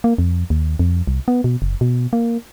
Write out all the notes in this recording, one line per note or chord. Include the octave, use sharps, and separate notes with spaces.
A#3
F2
D#2
F2
C2
B3
B2
F#1
B2
A#3